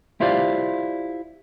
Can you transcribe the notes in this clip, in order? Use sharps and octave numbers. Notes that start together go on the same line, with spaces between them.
E4 F4 G4 C5 D5 F5